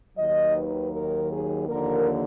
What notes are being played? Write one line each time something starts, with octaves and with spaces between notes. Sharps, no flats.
D#2 D#3 F#3 D#5
B4
A#4
G#4
D#2 D3 F3 A#3 A#4